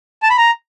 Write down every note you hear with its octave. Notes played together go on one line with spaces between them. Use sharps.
A5
B5
A#5